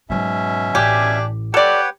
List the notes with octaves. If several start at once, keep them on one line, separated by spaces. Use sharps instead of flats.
G#2 B2 F#3 C#4 E5
A1 D4 G4 G#5
G4 A4 B4 C#5 D5 F#5